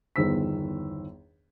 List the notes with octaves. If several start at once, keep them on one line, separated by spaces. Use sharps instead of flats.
G1 E2 D#3 C5 E6 B6